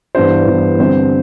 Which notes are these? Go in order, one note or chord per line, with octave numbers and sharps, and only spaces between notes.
G2 E3 B3 D4 C5
G2 E3 B3 D4
D3 G3 C4 C5